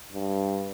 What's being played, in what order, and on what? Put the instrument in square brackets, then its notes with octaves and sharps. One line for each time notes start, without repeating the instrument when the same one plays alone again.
[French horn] G2